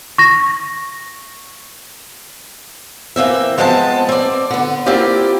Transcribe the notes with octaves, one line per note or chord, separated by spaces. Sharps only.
C#6 A#6
E3 A#3 C4 E5
F3 G#3 B3 C4 G#5 A5
C4 D5
D3 B3
A#3 C4 E4 F4 G4 D5